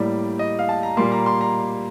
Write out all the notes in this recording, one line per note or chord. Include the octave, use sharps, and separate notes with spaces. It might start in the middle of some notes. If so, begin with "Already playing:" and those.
Already playing: A2 G3 A#3 D5
D#5
F5
A5
A#5
A#2 G3 A#3 C6
A#5
C6
A#5